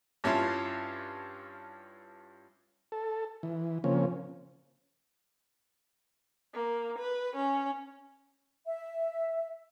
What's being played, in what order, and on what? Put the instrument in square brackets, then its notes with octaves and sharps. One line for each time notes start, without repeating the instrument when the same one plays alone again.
[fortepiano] G2 C#4 E4 F4 A5
[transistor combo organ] A4
E3
C#3 F3 A#3 C4 C#4
[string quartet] A#3
B4
C#4
[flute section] E5